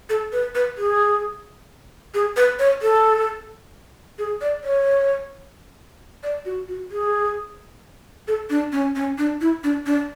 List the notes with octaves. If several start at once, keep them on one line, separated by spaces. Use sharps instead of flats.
A4
B4
B4
G#4
G#4
B4
C#5
A4
G#4
D5
C#5
D5
F#4
F#4
G#4
A4
D4
C#4
C#4
D4
E4
D4
D4